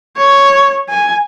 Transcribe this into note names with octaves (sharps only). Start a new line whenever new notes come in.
C#5
G#5